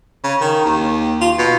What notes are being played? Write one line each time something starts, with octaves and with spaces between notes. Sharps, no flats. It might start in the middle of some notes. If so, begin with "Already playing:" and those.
C#3
D#3
D#2
F4
B2